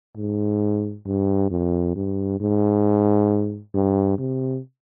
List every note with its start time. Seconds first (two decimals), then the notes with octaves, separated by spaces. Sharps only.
0.17 G#2
1.07 G2
1.51 F2
1.96 G2
2.40 G#2
3.74 G2
4.18 C3